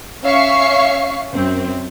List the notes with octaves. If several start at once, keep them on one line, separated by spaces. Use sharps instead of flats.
C#4 C#5 E5 F5 C#6 C7
F#2 C4